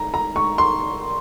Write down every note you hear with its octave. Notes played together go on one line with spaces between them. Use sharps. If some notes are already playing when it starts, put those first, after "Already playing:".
Already playing: A#5
A#5
C#6
C6